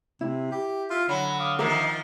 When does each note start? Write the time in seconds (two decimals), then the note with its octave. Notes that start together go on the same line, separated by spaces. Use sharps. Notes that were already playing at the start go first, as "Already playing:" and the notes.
0.21 C3 E4
0.51 G4
0.90 F4 E5 C6
1.09 D3 F#3 B5
1.40 F5 D6 D#6
1.59 D#3 F3 A#4 D#5 E5 D6